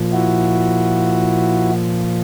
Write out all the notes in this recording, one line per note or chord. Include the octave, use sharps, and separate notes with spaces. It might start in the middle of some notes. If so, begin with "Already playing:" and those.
Already playing: A#2 F3
E4 F#4